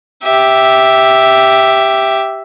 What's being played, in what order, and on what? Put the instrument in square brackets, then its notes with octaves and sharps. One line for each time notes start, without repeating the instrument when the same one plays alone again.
[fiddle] G4 E5